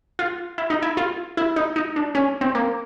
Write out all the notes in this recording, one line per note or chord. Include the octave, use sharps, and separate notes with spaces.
F4
E4
D#4
E4
F4
E4
D#4
D#4
D4
C#4
C4
A#3